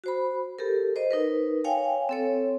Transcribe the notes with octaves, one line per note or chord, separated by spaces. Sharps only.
F#4 C5 B5
G4 A4 A#4
C5 D#5
D#4 A#4 B4
C#5 F5 G5 G#5
C4 A4 C#5